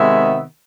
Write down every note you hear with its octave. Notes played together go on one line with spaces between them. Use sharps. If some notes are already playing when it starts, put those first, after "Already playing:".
Already playing: C3 D#3 G#3 B3 E5